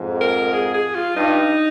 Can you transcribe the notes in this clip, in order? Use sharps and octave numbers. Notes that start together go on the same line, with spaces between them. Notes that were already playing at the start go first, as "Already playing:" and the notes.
Already playing: F2 G#2
A#4
G#4
G#4
F4
G2 D#4